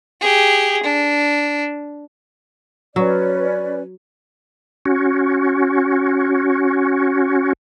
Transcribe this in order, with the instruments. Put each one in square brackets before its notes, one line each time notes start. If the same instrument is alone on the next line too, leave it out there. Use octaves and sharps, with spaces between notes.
[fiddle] G4 G#4
D4
[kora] F#3 [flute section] C#4 B4 D5
[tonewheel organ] C#4 F#4